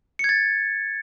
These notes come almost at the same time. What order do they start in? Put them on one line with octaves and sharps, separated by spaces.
C#7 G#6 A6